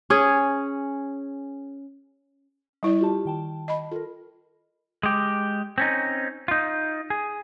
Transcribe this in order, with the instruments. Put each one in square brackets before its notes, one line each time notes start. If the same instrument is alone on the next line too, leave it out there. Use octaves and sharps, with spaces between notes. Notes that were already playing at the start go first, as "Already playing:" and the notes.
[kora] C#4 G#4 C#5
[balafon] G3 E4 D5
[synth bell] F4 G4 A5
D#3 G5 A5
[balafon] D#5 B5
[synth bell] F4 A#4 [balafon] A4
[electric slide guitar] G#3 G4
C4 C#4 D#4
D#4 F4
G#4